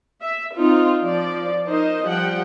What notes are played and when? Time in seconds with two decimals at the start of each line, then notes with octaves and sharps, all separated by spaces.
0.22 E5
0.55 C4 D#4 F4
1.03 F3 D5
1.67 D#4 A#4 C5 D#5
2.05 F3 G3 F#5 G5